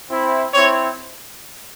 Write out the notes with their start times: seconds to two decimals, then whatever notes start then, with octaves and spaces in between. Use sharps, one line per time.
0.10 C4 E4
0.54 C4 E4 C#5